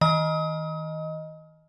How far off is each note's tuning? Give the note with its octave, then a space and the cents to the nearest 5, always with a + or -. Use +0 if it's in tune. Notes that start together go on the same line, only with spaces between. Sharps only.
D#3 +40 D#5 +0